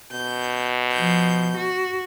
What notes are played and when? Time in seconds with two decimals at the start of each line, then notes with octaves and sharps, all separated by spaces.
0.12 B2 G6
0.92 F3 G6
1.56 F#4